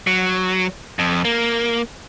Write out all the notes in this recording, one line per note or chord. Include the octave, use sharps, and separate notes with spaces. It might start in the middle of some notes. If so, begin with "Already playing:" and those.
F#3
F2
A#3